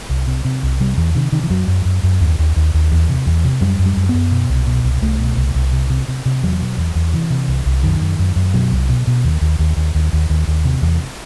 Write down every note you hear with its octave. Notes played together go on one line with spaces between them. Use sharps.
C2
C3
C3
C2
C3 G3
E2 E3
C3 D#3
C3 D#3
E3
F#2 F#3
F#2
F#2
F#2
D#2
D#2
D#2
D#2
E2
C3
E2
C3
F#2 G3
F#2
G3
F#2
F#2 B3
B2
C2
B2
C2
C2 A3
B2
C2
C2
C3
C3
C3
C3
E2 F#3
B2
E2
E2
C3 E3
C3
C2
C2
F#2 D#3
F#2
F#2
F#2
B2 F#3
C2
B2
B2
D#2
D#2
D#2
D#2
D#2
D#2
D#2
D#2
C3
E2